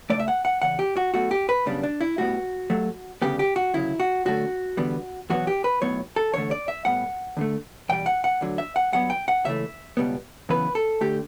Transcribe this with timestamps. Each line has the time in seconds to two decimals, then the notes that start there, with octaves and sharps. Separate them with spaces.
0.10 C#2 B2 A3 D5
0.20 E5
0.28 F#5
0.45 F#5
0.62 E2 C#3 F#5
0.79 G4
0.97 F#4
1.14 B1 B2 A3 F#4
1.31 G4
1.49 B4
1.66 F#2 C#3 G3 B3 D4
1.83 D4
2.01 E4
2.18 A2 G3 B3 F#4
2.70 G2 F#3 A3
3.22 D2 C#3 G3 B3 G4
3.39 G4
3.56 F#4
3.73 D2 C#3 F#3 E4
4.00 F#4
4.25 F#2 D3 A3 F#4
4.77 E2 D3 G3 B3
5.30 E2 B2 F#3 B3 F#4
5.47 G4
5.64 B4
5.81 B1 A2 F#3 B3 C#5
6.16 A4
6.33 E2 D3 A3 C#5
6.51 D5
6.68 E5
6.85 A2 G3 B3 F#5
7.37 D2 D3 A3
7.89 E2 B2 G3 G5
8.06 F#5
8.24 F#5
8.41 D2 D3 F#3
8.58 E5
8.76 F#5
8.92 G2 F#3 B3 F#5
9.10 G5
9.28 F#5
9.44 C#2 C#3 E3 A3 E5
9.97 C#2 B2 G3 B3
10.49 F#2 C#3 E3 B3 B4
10.75 A4
11.01 D3 A3 G4